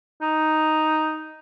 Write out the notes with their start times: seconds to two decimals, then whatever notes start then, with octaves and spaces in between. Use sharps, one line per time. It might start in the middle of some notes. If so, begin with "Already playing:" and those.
0.22 D#4